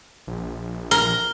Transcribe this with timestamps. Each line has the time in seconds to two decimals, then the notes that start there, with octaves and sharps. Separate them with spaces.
0.27 A#1
0.91 A#4 G7